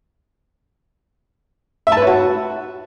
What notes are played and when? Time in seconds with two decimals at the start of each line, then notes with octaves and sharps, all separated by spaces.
1.87 E5
1.92 A5
1.97 B4
2.02 C#5
2.07 F#4